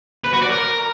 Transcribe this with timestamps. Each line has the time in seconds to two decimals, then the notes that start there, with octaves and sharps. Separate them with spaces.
0.25 B4
0.33 F#4
0.42 D5
0.51 A#4